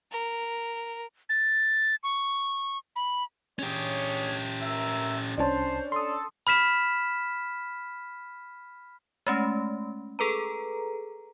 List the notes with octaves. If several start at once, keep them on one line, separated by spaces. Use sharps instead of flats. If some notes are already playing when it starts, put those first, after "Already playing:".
A#4
A6
C#6
B5
C#4 D4 G4 G#4 C#5
A#4 E5
C2 C#4 D4 C5 A5
A4 C6 D#6
B5 F6 B6 E7
G#3 A3 C#4
G#4 A4 B4 A#5